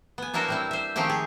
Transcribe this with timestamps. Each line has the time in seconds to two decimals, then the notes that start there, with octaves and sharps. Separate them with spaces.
0.18 B3 G#5
0.34 D4 E4 F#4 A#4 C5 C#5
0.48 G3 C4 E4
0.71 C5 E5
0.96 D#3 F3 G#3 A3 C4 G4
1.10 G#4